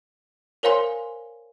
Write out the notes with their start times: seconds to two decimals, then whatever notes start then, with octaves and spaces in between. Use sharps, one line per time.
0.63 A#4 C5 C#5 F5 G#5 C6